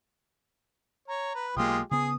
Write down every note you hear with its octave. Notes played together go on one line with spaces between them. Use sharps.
C#5 A#5
B4
B1 G#3 A#3 F4 G4 D#6
C#3 B3 G#4 D#6